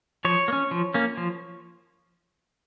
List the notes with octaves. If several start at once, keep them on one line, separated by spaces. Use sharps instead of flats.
F3 C#5
A#3
C#4
F3
A#3 C#4
F3